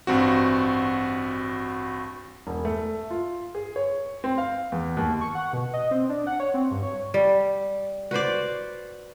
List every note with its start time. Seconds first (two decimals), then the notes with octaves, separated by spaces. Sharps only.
0.07 A1 G2 C4 F#4
2.47 E1
2.65 A3
3.11 F4
3.55 G#4
3.76 C#5
4.24 C4
4.38 F5
4.72 E2
4.97 D#2
5.21 C#6
5.35 F#5
5.53 B2
5.73 D#5
5.91 C4
6.09 D4
6.27 F#5
6.40 C#5
6.54 C4
6.71 G2
6.83 C#5
7.14 G3
8.11 F#4 B4 C5 D5